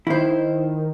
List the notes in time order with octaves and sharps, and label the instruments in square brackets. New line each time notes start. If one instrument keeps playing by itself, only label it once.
[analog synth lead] D#3 [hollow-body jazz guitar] E4 C5